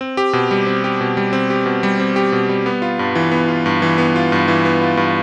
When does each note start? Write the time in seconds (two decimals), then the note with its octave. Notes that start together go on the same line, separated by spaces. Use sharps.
0.01 C4
0.17 G4
0.33 B2
0.51 G3
0.67 C4
0.84 G4
1.01 B2
1.17 G3
1.33 C4
1.50 G4
1.66 B2
1.83 G3
1.99 C4
2.16 G4
2.32 B2
2.49 G3
2.66 B3
2.82 F4
2.99 G2
3.15 E3
3.32 B3
3.48 F4
3.66 G2
3.82 E3
3.98 B3
4.16 F4
4.32 G2
4.48 E3
4.65 B3
4.82 F4
4.97 G2